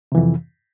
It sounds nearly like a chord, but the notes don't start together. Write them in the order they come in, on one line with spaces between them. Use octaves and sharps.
C3 E3 F2